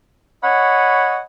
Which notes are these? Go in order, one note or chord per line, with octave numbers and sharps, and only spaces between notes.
C#5 D#5 F#5 G#5 B5